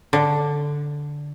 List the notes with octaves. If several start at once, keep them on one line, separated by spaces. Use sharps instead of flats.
D3